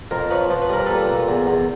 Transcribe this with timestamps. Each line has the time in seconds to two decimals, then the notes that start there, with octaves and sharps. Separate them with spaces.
0.11 F2 A#4 C5
0.30 F3 B4 C#5
0.50 F3 C5
0.62 B4
0.69 G3 A#4
0.86 A#2 A4 B4
1.09 A#2
1.28 E2
1.47 E2